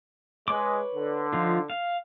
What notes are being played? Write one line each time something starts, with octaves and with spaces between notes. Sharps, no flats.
G#3 B4 C#5 D6
D3
F3 D#4 F4
F5